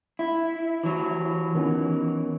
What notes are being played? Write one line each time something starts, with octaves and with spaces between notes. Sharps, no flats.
E4
E3 F#3
D#3 B3 C#4